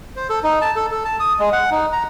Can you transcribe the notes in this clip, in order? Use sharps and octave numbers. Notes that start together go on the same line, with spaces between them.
C5
A4
D#4
A5
A4
A4
A5
D#6
G#3
F#5
D#4
A#5